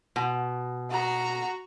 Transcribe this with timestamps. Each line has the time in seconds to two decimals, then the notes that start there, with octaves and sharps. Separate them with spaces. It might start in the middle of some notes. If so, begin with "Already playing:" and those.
0.16 B2
0.91 F#4 A#5